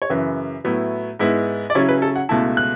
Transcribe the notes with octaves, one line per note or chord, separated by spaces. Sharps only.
C#5
F#2 C#3 E3 B4
A2 F#3 B3 E4
G#2 G#3 B3 E4
D5
C#3 F#3 C#4 E4 C#5
B4
A4
F#5
C#2 B2 A3 E4 A5
F#6